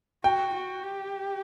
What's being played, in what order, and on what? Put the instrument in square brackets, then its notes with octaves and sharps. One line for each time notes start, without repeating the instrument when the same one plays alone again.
[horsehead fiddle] F#4 [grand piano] G5
[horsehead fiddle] F#4
G4